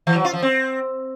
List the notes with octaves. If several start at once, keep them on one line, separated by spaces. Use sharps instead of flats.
E3
F#3
F4
F3
C4